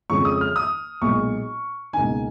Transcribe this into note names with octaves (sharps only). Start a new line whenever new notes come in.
F2 C#3 F3 G#3 C#4 C#6
D#6
F6
D#6
B1 A#2 G#3 C#6
C#2 B2 A#3 D#4 G#5